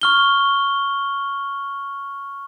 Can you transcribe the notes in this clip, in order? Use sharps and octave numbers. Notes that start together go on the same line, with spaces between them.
C#6 F6 G7